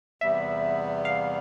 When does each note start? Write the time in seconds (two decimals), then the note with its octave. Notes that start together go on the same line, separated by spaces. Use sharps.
0.21 E2 C3 G3 B3 E5
1.05 F5